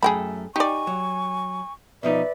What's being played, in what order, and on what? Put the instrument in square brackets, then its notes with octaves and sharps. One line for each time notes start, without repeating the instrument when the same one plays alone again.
[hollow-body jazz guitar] F#2 A3 [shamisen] G#4 G5 B5
[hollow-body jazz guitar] D#4 [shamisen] G4 D5 [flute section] G#5 C#6
[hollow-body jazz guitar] F#3
[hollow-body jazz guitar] B2 F3 D#4 [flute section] B4 D5 E5